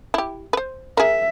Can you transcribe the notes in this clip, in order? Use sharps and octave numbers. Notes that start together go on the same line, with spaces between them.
E4 G4
B4 C5
G#4 A#4 E5